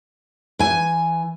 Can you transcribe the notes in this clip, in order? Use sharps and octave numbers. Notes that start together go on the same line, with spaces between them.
E3 G#5